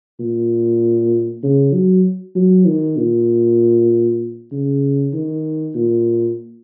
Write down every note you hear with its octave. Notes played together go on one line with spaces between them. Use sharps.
A#2
C#3
F#3
F#3
D#3
A#2
C#3
D#3
A#2